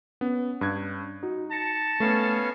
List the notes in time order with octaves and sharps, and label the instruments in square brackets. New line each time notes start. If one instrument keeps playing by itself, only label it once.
[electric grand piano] B3 [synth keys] C#4
[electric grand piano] G2 F#6 G#6
[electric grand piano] D#4 [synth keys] F#4
[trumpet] A5 [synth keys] A#6 C#7
[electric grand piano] A3 [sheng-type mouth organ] B3 C#4 F5